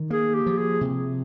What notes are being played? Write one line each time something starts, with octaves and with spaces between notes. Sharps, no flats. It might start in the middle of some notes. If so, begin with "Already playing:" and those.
Already playing: D#3
A#3 G#4
G4
F3
G#4
C3